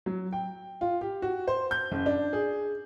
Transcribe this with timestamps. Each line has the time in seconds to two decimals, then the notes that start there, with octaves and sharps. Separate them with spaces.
0.06 F#3
0.33 G5
0.81 F4
1.01 G4
1.22 F#4
1.48 C5
1.71 G6
1.92 F#1
2.06 D4
2.33 G#4